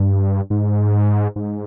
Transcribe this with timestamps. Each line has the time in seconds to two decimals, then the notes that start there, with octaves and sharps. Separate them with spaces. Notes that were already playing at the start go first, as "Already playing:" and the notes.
Already playing: G2
0.50 G#2
1.36 G#2